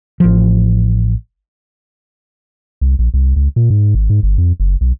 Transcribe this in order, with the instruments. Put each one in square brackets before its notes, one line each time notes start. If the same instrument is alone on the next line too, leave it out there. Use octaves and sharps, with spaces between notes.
[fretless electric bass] A1 F3
[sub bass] C2
A#1
C2
C#2
A#2
G#2
G#1
G#2
G1
F2
F#1
B1